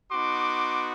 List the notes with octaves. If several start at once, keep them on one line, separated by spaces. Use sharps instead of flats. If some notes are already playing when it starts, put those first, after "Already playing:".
B3 D#4 F#4 C6 D6